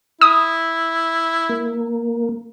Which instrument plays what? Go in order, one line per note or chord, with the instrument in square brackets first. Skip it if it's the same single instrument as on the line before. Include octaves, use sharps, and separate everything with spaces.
[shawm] E4 [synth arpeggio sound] D#6
[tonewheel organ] A#3